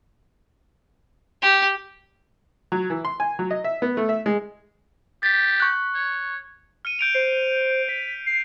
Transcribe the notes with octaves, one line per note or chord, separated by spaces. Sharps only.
G4
F#3
E3
C6
G#5
F#3
D#5
E5
B3
A3
E5
G#3
G4 A6 B6
C#6 F#6
C#5
F6 C#7 D#7
G6 D7 F7
C5 C7
B6
C7